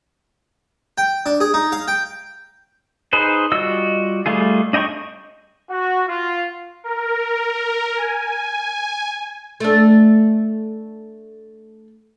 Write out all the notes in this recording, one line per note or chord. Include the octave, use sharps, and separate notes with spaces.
G5
D4
G#4
D#4
F5
G5
D#4 G#4 B4 C5
G3 F4 F#4 D#5 E6
G3 A3 F4 G#4
D4 D#5 G5 A#5 C#6
F#4
F4
A#4
G#5
A3 D4